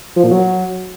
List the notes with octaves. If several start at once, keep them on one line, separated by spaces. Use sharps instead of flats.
F3
A#2
F#3